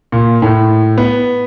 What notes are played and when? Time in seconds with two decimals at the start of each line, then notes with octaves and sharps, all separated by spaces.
0.12 A#2
0.42 A2
0.98 B3